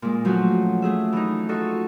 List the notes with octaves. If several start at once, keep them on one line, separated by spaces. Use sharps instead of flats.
A#2 G#3
F3 F#3 A3 C#4 F#4
A3 G#4 E5
E3 D#4
F4 F#4 A4 D#5 C#6